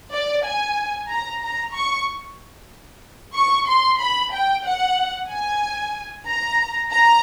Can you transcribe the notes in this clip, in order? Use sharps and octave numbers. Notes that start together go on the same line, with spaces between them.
D5
G#5
A#5
A#5
C#6
C#6
C6
B5
G5
F#5
G#5
A#5
A#5